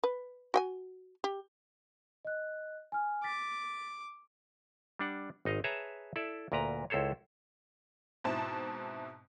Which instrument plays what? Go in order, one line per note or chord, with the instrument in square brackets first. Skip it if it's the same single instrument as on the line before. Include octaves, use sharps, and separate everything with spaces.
[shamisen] B4
F#4 G5 G#5
G4
[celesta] D#5 F#6
G#5 F6
[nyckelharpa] D6 [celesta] A6 B6
[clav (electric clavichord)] G3 D4 F#5
G#1 D#4 D#5 F5
G#4 B4 C#5 E5 A5 A#5
E4 A4 D5 E5
D2 A#2 A#4 B4 A#5
C#2 E4 A4 C5 C#5
[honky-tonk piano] G#2 B2 C4 E4 A5